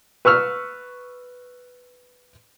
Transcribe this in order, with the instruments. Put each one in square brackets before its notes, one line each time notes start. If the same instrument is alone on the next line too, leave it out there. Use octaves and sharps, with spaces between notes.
[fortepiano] B4 C#6 E6 F6